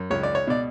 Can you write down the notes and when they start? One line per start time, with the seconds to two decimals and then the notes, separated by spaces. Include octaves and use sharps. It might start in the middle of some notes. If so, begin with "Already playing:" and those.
Already playing: F#2
0.10 C#2 C#5
0.23 D5
0.35 C#5
0.47 B2 D5